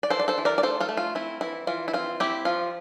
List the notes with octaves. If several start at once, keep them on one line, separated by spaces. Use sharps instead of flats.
D5
E3 A4 C5
D5
A4 C5
E3
A#4 D5
D5
A3 A4 C5
F4 A4
A3
F4
C4 E4
E3 E4
E3 F4
E4
C4 F4
C4 E4 G4
F3 F4